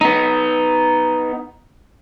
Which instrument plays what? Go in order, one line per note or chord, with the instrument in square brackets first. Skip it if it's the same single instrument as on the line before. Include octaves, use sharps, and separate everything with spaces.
[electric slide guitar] B3 D#4